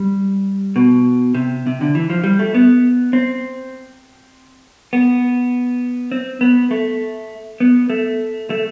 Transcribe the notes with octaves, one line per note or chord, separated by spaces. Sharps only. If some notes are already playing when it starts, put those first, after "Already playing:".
Already playing: G3
B2
C3
C3
D3
E3
F3
G3
A3
B3
C4
B3
C4
B3
A3
B3
A3
A3